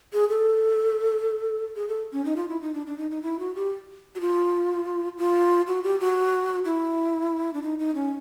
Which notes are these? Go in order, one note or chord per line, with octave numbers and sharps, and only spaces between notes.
G#4
A4
G#4
A4
C#4
D#4
F4
E4
D#4
D4
D4
D#4
D#4
E4
F#4
G4
F#4
F4
F4
F#4
G4
F#4
E4
D4
D#4
D#4
C#4